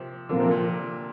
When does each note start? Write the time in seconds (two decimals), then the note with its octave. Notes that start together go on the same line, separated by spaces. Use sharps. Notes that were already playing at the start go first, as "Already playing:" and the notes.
Already playing: C3 F3 A#3
0.29 A#2 D3 F3 C4 F4 A#4
0.40 C3
0.51 A#2